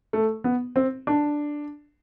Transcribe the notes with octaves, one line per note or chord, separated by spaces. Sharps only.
A3
B3
C4
D4